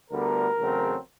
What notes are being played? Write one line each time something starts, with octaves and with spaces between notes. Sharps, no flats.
D2 D3 G3 B3 A#4
E2 C#3 F#3 A3 C4